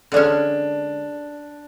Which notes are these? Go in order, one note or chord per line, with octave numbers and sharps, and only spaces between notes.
D3 G#3 C#4 D4